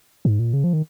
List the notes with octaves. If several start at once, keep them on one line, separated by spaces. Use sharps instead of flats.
G#2
A#2
C#3
F3
D#3